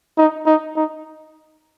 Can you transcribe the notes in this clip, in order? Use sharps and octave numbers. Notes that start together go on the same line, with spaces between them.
D#4
D#4
D#4